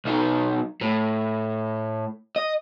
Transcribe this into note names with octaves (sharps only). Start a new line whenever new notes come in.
B1 D#4
A2
D#5